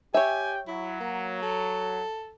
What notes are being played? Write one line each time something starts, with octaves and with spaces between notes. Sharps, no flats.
G4 C#5 E5 G5 G#5
F#3 E4
A#3
A4